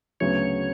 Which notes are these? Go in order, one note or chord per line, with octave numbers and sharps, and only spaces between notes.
D2 C#3 F#3 B3 C#5